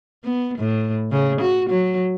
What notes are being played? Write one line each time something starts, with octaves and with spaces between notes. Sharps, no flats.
B3
A2
C#3
F#4
F#3